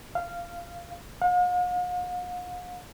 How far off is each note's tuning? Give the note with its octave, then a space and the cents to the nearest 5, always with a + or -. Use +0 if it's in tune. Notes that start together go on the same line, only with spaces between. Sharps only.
F5 -15
F5 +45